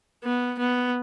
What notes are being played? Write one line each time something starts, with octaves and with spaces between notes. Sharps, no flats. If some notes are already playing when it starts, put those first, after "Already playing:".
B3
B3